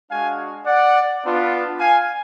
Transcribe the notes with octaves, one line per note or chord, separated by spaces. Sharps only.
G#3 D4 F#4 F5 G#5
D5 F#5
B3 D4 F4
F5 G#5